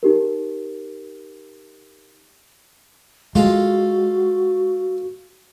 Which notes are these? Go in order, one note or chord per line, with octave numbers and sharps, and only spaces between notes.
D#4 G4 A#4
G#3 F4 F#4 A4